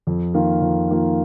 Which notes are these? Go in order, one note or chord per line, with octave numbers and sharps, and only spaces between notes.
F2
D#3 A#3 F4
F2
D#3 A#3 F4